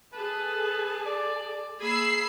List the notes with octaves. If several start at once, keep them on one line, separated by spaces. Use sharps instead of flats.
G#4 A4 B4 A5
D5
A#3 G#4 B5 E6 C7